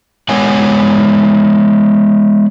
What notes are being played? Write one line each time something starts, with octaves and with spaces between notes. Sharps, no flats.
G#3 B3 C#5 F#5 G#5